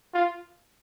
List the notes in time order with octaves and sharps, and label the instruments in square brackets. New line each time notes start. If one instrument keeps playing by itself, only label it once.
[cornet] F4